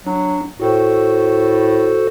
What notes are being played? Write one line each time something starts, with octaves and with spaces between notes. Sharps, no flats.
F#3 D4
A2 F#4 A4 C5